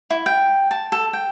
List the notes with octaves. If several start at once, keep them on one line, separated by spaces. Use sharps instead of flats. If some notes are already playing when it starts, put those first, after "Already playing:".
E4
G5
A5
A4
G5